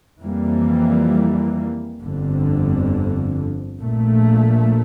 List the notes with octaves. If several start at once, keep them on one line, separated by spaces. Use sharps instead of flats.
F2 E3 G3 A#3
G1 F2 D3
A#1 A#2 A3